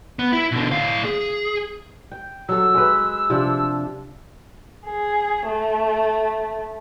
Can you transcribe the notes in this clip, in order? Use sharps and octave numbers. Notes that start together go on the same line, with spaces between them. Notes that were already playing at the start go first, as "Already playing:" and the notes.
B3
E4
B2 D3
A2 F5
G#4
G5
F#3 A4 E6
G#3 B4
C3 F3 D4
G#4
A3